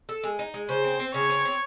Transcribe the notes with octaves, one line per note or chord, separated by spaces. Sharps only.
A4
G#3
D#4
G#3
C#3 C5
C4
C4
C#3 C#5
C4
C4